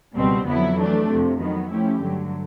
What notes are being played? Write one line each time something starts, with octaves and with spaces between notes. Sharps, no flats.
C#2 B2 G3 C4
F2 D3 F#3 B3 E4
E3 A3 D4
F2 C3 F3
D#3 F#3 B3
F3 A3 C#4 E4 G4
G2 D3 F#3 A3